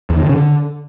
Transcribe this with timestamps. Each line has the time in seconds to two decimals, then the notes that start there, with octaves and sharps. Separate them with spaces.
0.10 E2
0.16 D#3
0.23 D3
0.29 C#3
0.36 D3